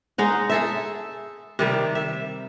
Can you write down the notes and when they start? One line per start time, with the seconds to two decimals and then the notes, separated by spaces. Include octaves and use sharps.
0.18 G#3 D#4 F#5
0.50 G#4 A4 E5
1.59 C3 D#3 G3
1.95 E5